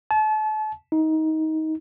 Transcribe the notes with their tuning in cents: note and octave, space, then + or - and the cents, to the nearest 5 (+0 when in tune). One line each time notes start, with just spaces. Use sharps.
A5 -35
D#4 +20